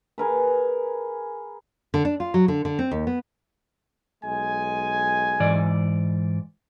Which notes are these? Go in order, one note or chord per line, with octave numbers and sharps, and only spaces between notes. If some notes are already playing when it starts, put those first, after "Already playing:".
G#4 A#4 B4
D3
D4
F4
F#3
D3
D3
C4
D#2
B3
B1 G#3 G#5
G#2 E3 D5